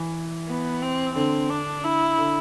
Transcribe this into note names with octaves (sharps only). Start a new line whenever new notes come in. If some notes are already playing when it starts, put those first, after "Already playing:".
Already playing: E3
B3
C4
D3 C4
D4
E4
D3